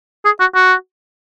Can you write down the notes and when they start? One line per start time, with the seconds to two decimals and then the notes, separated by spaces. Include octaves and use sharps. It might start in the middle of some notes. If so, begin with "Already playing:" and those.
0.25 G#4
0.40 F#4
0.55 F#4